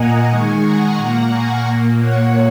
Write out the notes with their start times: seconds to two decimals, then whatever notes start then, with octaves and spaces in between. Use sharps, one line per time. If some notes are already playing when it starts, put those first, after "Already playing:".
Already playing: A#2 A#3 D#5 F#5 G#5 A#5
0.28 D#3 G#3 G#5 C#6
0.63 F#5 A#5
0.98 A#2 A#3
1.32 G#5 C#6
1.66 A#2 A#3
2.01 C#5 F#5